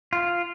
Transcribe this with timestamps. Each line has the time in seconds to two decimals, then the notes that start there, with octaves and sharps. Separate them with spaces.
0.13 F4